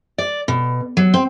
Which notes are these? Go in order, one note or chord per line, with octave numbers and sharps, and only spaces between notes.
D5
B2
F#3
C4